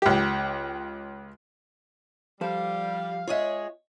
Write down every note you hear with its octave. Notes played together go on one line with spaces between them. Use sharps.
C#2 G4
F3 G3 A4 C5 F5
G#3 F4 G#4 C#5 D#5 E5